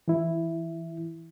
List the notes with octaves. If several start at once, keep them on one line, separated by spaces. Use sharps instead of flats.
E3 E4